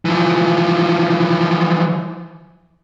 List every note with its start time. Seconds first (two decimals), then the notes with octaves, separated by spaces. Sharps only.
0.05 E3 F3